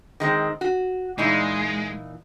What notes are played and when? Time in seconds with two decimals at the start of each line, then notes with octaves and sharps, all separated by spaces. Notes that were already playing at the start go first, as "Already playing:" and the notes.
0.20 D#3 G#3 C4
0.61 F#4
1.18 A#2 E3 G#3 D#4